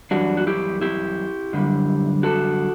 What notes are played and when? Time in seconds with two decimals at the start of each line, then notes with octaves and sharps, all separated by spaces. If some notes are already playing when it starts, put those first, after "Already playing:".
0.11 F#2 E3 G3 D4 F#4
0.37 F#4
0.47 E4 G4
0.81 E4 G4
1.53 F#2 D3 G3
2.23 F#4 A4